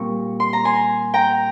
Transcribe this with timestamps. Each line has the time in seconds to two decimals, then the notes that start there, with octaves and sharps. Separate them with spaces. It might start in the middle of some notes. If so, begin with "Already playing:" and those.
Already playing: A#2 G3 C4 C#6
0.40 C6
0.53 A#5
0.65 G#5 C6
1.14 G5 A#5